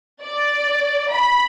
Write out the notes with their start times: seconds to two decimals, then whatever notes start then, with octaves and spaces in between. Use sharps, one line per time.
0.23 D5
1.12 B5